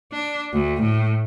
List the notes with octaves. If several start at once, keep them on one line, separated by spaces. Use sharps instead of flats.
D4
D2
A2